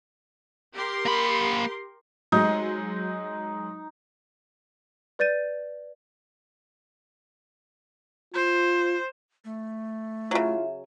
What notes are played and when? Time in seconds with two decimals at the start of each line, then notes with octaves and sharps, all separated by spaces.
0.73 G4 A#4 C6
1.06 A#3 B5
2.32 F#3 G#3 D#4
5.19 B4 D5 G6 A6 D#7
8.34 F4 C5
9.45 A3
10.31 C#3 F#3 E4 F4 E5